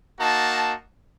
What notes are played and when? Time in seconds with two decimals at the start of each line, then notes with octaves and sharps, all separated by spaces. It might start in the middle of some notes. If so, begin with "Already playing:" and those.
0.20 A#3 D#4 F#4 A5